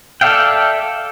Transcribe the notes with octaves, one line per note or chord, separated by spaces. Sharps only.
A4 D5 E5 F5 G5